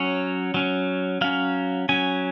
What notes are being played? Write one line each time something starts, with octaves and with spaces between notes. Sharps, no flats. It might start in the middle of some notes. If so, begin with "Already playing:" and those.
Already playing: F#3 C#4 C#5
F#3 C#4
F#3 C#4 F5
F#3 C#4 G#5